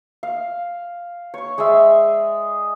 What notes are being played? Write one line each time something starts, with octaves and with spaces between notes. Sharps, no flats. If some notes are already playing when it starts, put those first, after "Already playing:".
F5
C#5 C#6
G#3 G#4 D5 E5